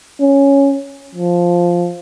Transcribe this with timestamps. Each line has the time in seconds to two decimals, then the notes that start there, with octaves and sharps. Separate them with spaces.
0.21 C#4
1.15 F3